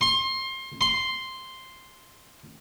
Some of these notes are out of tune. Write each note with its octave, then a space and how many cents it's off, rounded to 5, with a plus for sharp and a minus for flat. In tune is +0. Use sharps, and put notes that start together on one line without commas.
C6 +25
C6 +0